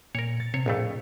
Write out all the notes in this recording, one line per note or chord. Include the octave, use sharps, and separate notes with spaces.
A#2 A#4 C#5
A6
C3 C#5
A#1 F2 A2 A3